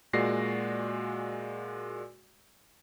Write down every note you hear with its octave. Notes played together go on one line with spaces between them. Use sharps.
A#2 G#3 F#4 D5 A#6 C7